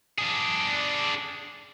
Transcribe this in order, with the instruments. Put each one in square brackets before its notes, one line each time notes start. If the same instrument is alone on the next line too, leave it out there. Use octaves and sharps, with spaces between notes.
[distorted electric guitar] D4 G#4